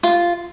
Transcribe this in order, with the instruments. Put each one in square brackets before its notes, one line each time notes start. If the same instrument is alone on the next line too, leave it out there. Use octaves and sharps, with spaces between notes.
[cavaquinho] F4